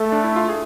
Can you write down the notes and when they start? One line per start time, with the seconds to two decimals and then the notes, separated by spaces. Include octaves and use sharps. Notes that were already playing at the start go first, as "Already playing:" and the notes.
Already playing: A3 A4
0.12 D4
0.24 E4
0.36 F4
0.49 G#4